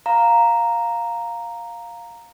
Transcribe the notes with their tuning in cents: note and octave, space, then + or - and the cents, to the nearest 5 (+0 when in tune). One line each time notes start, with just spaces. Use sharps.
F5 +5 A#5 +0